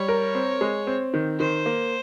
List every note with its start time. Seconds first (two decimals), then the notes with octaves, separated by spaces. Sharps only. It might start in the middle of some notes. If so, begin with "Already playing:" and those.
Already playing: G3 C#5
0.08 A#4
0.35 C4
0.61 G#3
0.87 C4
1.14 D#3
1.40 D#3 C5
1.66 A#3